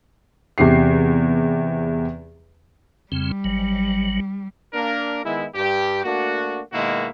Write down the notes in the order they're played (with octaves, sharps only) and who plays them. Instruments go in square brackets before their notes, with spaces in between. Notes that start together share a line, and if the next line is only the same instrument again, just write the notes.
[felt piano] E2 C3 G4 C7
[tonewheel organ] F2 C#3 C4 [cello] G3
[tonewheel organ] G#1 F#3
[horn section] A#3 D4 A#4
D#3 G#3 B3 E4
G2 G4
A3 A#3 D4 F#4
B2 D#3 G#3 A#3 E4 F#4